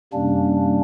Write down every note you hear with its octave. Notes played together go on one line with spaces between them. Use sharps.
F#2 C3 G3 A#3 C#4 D4